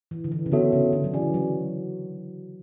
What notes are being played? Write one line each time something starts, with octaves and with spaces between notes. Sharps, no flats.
E3
D3
E3
C#3
D3 B3 F#4 A4 C#5 E5
C#3
D3
F#3
E3 C#4 G#4 D5 G#5
F#3